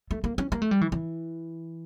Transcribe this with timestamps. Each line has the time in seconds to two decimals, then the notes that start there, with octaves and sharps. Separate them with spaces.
0.11 A3
0.24 A#3
0.38 C#4
0.52 A#3
0.62 A3
0.71 G3
0.81 E3
0.92 E3